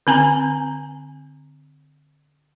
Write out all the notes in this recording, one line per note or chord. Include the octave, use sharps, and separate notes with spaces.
D3 C4 G#5 A#5